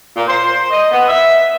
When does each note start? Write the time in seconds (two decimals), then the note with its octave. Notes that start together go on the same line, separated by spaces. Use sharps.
0.15 A#2
0.27 C5
0.70 D#5
0.92 B3
1.08 E5